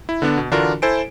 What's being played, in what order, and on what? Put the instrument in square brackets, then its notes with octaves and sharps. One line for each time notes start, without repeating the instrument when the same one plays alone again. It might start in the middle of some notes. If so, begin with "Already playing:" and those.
[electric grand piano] E4
D3 B3 D4
B2
D3 E3 D4 F4 F#4 A#4
E4 A4 C5 G#5 D7